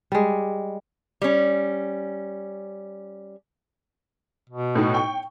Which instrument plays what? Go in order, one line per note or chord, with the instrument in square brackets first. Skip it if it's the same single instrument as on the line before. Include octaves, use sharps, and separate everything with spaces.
[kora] G3 G#3
[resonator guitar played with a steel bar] G3 C#4
[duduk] B2
[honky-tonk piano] A2 D#4
G5 C#6